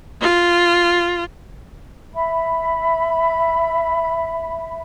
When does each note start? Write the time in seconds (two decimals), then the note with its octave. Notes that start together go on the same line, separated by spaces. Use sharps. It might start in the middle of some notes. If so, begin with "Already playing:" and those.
0.22 F4
2.14 E5 B5